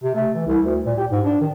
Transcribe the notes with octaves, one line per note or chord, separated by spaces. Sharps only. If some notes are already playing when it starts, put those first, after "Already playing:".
C3
A3
E3
C2
D2
A#2
G4
G#2
D4
D#3